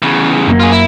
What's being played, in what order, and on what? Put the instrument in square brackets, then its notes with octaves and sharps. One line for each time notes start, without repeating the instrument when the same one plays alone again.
[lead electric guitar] E2 C#3
[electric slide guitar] F#2 A#3
[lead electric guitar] F4 G#4
E4